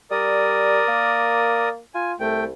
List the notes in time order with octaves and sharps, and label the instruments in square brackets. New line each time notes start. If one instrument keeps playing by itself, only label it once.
[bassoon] G3 [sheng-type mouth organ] A#4 D5 D#6
[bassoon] A#3
[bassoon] F4 [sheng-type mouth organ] G#5
[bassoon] C2 [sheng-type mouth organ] A3 G5